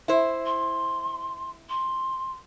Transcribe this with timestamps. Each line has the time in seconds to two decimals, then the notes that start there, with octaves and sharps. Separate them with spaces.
0.08 E4 C5
0.45 C6
1.68 C6